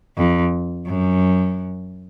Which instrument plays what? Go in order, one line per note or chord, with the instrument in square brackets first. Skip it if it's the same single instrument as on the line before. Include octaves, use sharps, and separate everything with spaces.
[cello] F2
F#2